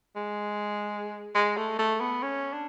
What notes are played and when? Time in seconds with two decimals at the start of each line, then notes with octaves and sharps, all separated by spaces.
0.16 G#3
1.35 G#3
1.57 A3
1.79 A3
2.00 B3
2.23 C#4
2.53 D4